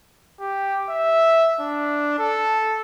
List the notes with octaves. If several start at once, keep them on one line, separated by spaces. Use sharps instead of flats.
G4
E5
D4
A4